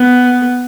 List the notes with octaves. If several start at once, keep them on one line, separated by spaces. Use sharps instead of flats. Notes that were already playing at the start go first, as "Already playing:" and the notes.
Already playing: B3